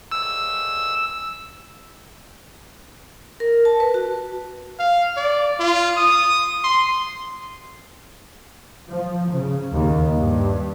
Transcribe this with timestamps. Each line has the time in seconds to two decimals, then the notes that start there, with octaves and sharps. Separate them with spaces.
0.12 E6
3.40 A#4
3.65 A5
3.80 B4
3.94 F#4
4.79 F5
5.17 D5
5.59 F4
5.97 D#6
6.64 C6
8.88 F3
9.33 C#3
9.74 D#2
10.14 G2